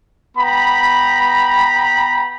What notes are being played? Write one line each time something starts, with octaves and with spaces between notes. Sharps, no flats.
B3 G5 A#5 B5